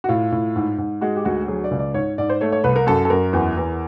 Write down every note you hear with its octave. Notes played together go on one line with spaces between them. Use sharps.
F#4
A2 F4
A2
G#2
G#2
G#3 F#4
G4
D2 F#4
F#3 G#4
D5
C#2
D5
G#2 C#5
G#2 D5
C5
A3 C#5
C#5
C2 B4
A#4
F#2 A4
A4
F#2 A#4
E2
E2